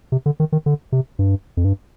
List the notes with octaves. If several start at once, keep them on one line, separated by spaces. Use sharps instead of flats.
C3
D3
D#3
D#3
D3
C3
G2
F2
G2